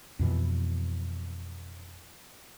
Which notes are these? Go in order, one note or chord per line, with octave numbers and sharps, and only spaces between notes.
F2 B2 E3